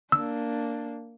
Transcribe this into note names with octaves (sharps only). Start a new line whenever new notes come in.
A#3 D4 E6